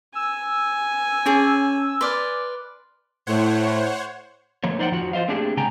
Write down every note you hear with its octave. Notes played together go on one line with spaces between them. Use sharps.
G#5 E6
C#4 G#4 C#5 A5
B4 D5 C6 D6 F6
A2 C5 C#5 F#5
F3 A3 A#3 C#5
D#4 C5 D5 D#5 F#5 G5
F2 F3 F#4
F4 C5 D#5 F5
A3 A#3 C4 D4 G4 G#4
C#3 G#3 G5 G#5 A#5